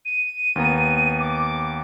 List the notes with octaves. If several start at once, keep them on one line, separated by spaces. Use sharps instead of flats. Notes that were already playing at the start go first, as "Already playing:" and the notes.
D#7
D#2 B3 A#5
D6